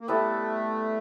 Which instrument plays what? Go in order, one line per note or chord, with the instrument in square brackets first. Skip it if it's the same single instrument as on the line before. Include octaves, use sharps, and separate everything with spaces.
[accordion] A#3
[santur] G3 B3 E4 A4 [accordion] A3